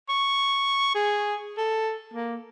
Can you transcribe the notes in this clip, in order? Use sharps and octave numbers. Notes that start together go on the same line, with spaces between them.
C#6
G#4
A4
A#3